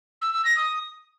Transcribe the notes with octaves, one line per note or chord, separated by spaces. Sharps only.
E6
E6
A#6
D#6